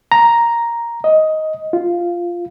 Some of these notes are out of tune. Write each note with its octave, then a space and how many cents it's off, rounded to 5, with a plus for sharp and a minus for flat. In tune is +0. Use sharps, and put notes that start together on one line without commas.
A#5 +5
D#5 +10
F4 -5